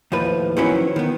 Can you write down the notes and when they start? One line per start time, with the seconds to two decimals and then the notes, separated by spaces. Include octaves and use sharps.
0.12 D#2 A2 F3 B4
0.57 D#3 F3 F#3 B3 C#4 E4
0.96 D#3 B3